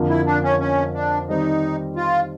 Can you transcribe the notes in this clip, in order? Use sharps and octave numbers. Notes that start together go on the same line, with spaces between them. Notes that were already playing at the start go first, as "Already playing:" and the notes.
Already playing: F2 D3 F3 A#3
E4
D4
C#4
C#4
D4
D#3 G3 C4 D#4
F4